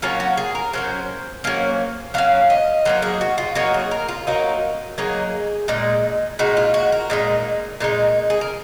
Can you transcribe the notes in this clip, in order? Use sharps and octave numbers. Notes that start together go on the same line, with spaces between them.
F#3 A#3 C#4 F4
F#4
G#4
A#4
F#3 A#3 C#4 C5
F#3 A#3 C#4
F#3 A#3 C#4 F5
D#5
F#3 A#3 D#4 C5
G#4
F#4
F4
F#3 A#3 D#4 F#4
G#4
A#4
F4
F#3 A#3 D#4
F#3 A#3 D#4 G#4
A#2 G#3 D#4
A#2 G#3 D#4 F#4
F4
F#4
A#4
A#2 G#3 D#4
A#2 G#3 D#4
G#4
A#4